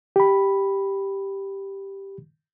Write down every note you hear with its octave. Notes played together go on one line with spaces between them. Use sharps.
G4 B5